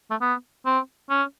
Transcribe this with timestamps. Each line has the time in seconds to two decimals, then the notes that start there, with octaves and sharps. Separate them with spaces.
0.11 A3
0.21 B3
0.66 C4
1.10 C#4